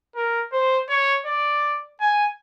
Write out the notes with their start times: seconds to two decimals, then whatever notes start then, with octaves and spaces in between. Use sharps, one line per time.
0.16 A#4
0.52 C5
0.89 C#5
1.26 D5
2.00 G#5